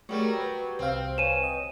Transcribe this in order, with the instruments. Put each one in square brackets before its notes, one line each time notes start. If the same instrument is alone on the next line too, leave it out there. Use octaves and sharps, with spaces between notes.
[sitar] F#3 G3 [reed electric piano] A3 G#4 A#4 [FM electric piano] C#6
[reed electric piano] B4
[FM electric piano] C2 F5 [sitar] C4
[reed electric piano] B4 C#5 G#5 [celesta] D#7 E7
[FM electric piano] D#5